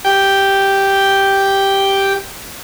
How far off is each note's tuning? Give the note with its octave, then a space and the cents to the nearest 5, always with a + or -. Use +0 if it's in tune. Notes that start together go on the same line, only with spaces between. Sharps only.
G4 +0 G5 +0